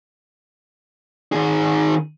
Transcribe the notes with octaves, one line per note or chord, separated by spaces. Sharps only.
D#3 G#4